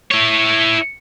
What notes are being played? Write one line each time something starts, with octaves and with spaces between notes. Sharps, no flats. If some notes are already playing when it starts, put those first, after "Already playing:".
E4 C#5